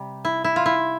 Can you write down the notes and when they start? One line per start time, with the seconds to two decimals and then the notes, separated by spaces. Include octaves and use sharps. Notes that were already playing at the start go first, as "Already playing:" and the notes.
Already playing: C3 G3
0.25 E4
0.44 E4
0.56 F4
0.66 E4